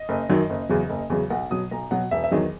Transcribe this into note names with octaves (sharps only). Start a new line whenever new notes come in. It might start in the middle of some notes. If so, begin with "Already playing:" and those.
Already playing: D#5
F#1
F#2 D#3 F#3
F#1
E2 C#3 F#3
F#1
E2 C#3 F#3
B1 F#5
B2 F#3 D#6
B1 A#5
B2 F#3 F#5
E1 E5
E5
E2 D#3 F#3 D#5